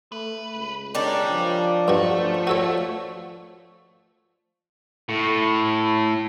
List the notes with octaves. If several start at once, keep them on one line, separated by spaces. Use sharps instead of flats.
A3 B4
C#2
D#3 C#4 D4 G4 D5
F3
G2 A3 F#4
F#4 A4 C#5
A2